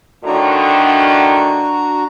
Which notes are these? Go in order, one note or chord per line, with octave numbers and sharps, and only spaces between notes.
A2 D3 D#3 D4 F#4 A#5